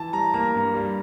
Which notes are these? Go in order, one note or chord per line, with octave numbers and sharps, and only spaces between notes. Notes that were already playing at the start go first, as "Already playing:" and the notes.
Already playing: E3 A5
G3 A#5
A#3 A#5
G2
G3